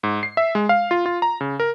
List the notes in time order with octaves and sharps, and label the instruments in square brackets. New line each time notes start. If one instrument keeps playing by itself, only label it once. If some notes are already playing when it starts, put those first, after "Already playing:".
[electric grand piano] G#2
C7
E5
G#3
F5
F4
F4
A#5
C#3
A#4